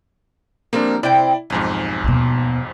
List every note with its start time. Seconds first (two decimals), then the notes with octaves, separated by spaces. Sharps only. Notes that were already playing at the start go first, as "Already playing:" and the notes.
0.73 F3 G3 A#3 C4 D4 A#4
1.03 C3 E4 C5 D5 G5
1.50 B1 F2 G#2 G#5
2.04 D#2 B2